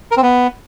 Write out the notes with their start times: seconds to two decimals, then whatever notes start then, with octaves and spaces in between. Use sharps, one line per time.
0.11 A#4
0.17 C4
0.23 B3